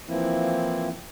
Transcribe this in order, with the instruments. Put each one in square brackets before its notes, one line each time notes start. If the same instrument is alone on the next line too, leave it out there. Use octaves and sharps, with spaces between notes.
[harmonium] E3 F3 A#3 C4 E4